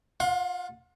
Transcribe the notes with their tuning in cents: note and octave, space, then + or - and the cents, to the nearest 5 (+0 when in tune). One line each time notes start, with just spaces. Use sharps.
F4 +10 F#5 -35 C6 +30